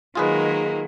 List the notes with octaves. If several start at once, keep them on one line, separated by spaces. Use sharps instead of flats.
D#3 F#3 G#3 A#3 F4 G#4 B4